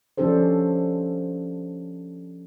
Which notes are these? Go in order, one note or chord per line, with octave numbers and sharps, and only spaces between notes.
F3 C#4 D4 G4 A4 C5